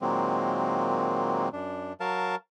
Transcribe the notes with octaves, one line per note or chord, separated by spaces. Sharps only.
A#2 D#3 F#3 G#3 A#3 C4
F#2 D4
F#3 A#4 F5 A5